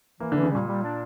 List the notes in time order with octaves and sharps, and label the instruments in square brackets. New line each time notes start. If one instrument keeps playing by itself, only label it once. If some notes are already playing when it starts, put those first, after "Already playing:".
[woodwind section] E3 [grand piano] A#3
[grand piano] D3 [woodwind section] E3
[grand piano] C#3
[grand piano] A#2 [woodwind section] G3
[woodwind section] G3
D4